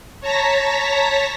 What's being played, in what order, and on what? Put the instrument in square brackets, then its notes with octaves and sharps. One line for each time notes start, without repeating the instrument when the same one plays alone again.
[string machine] C#5 A5 A#5 A#6 B6